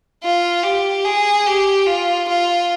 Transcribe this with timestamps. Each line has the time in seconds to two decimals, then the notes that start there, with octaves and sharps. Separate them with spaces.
0.23 F4
0.64 G4
1.05 G#4
1.46 G4
1.86 F4
2.28 F4